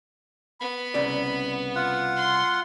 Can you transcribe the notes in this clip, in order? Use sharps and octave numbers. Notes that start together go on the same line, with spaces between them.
B3 B5
C2 C#3 D5
F4 F#5
C6